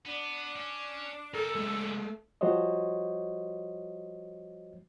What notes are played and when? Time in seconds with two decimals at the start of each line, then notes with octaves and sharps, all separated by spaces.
0.06 B3 D4
0.56 C#4
1.34 C#3 G3 A4 A#4
1.55 G#3 A3
2.41 F3 G3 F#4 C5 C#5 D#5